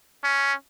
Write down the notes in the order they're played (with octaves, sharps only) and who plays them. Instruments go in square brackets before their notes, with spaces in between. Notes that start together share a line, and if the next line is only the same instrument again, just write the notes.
[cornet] C#4